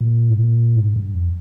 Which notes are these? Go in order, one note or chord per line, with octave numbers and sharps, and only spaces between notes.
A#2
G#2
A#2
G#2
G2
F2